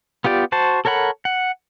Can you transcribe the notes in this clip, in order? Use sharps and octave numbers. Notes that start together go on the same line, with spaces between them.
B3 F4 G4 D5
F#4 C5 A5
A4 A#4 C#5 F#5 B5
F#5